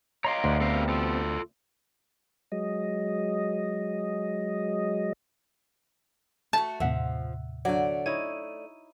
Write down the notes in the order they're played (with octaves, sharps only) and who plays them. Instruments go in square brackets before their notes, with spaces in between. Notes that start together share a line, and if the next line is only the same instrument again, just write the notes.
[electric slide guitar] C#5 D#5 F5 [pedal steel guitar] A#5 C6 D6
[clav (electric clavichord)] D2
[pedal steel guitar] B3 C4 G4 [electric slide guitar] A4 A#4 F5
[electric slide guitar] F4 A4
[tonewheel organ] F#3 G#3 D#5
[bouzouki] A3 F#4 [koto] A5
[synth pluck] D#2 A2 C3 [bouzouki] F3 [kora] E5 F#5
[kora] D3 F#3 [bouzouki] A3 D5
[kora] D#4 E4 C#5 [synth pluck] D#7